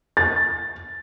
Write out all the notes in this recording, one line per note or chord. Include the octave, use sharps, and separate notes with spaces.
A6